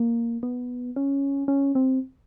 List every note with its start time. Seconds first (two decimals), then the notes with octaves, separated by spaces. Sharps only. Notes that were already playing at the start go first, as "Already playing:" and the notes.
Already playing: A#3
0.43 B3
0.96 C#4
1.48 C#4
1.75 C4